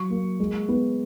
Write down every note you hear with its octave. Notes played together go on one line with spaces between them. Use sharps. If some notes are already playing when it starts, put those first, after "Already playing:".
Already playing: F#3 C#6
A#3
G#3
B3